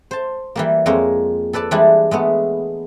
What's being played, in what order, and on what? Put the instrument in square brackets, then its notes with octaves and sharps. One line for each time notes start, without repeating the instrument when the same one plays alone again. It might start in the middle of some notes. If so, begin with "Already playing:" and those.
[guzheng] C5 A5
E3 G3 A#3
F2 G#3 A#3 C#5
A4 B4 D5 A5
E3 G3 G#3 D4 E4
G#3 A3 B3